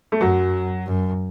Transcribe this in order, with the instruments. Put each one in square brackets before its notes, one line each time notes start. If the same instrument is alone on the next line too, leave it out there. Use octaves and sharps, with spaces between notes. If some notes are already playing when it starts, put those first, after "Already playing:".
[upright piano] A3
[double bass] F#2 [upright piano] F#3
[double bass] F#2